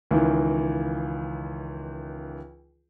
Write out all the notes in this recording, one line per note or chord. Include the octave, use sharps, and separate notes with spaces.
C#2 D#3 E3